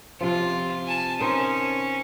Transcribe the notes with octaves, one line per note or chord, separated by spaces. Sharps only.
C3 F3 F4
G#5 A5
C#4 D#4 A#4 C5